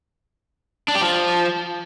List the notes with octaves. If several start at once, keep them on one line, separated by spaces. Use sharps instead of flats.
D4
G4
F3